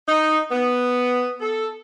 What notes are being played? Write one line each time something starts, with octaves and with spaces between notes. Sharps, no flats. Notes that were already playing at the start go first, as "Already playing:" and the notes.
D#4
B3
A4